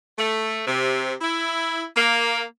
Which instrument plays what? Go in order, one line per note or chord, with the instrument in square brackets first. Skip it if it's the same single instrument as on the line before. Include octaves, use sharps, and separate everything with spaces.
[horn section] A3
C3
E4
A#3